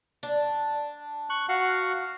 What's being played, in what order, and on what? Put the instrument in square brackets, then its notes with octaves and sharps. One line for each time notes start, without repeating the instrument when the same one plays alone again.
[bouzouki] D4
[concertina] C#6 F#6
F#4 F5 F#5